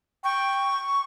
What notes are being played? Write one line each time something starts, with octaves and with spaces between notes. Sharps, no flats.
G5 C#6